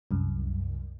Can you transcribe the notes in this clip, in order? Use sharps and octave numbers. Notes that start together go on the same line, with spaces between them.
C2 F#2